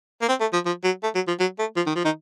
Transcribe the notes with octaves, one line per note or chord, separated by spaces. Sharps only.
A#3
C4
A3
F3
F3
F#3
A3
F#3
F3
F#3
A3
F3
D#3
F3
D#3 D#4